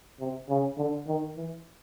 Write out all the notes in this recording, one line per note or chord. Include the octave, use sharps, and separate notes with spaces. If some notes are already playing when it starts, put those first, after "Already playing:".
C3
C#3
D3
D#3
E3